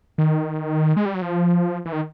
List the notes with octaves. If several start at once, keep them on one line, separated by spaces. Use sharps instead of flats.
D#3
G#3
G3
F#3
F3
E3
D#3